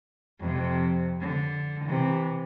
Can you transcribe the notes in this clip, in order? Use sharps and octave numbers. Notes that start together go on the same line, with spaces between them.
F2 C3
D3
C3 E3